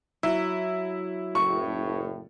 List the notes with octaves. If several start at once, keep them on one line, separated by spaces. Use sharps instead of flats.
F#3 E4
F#1 A2 C#6